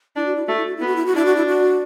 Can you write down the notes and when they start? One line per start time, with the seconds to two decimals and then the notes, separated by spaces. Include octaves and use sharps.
0.16 D4 E4
0.26 F#4
0.36 E4
0.46 A3 F#4
0.57 E4
0.66 F#4
0.77 B3 E4
0.86 F#4
0.96 E4
1.06 F#4
1.14 D4 E4
1.26 F#4
1.36 E4
1.46 F#4